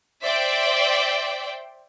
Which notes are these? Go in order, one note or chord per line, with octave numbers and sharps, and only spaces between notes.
C5 D5 E5 G5